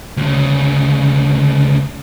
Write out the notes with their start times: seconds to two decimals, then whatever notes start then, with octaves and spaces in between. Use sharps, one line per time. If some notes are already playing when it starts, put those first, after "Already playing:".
0.17 D2 C#3